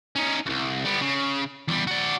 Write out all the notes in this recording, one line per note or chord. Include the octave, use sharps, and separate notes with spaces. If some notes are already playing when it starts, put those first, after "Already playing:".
C#4 D#4
C2 F#2
G3 B3
C#3
E2 G3
F#4 D5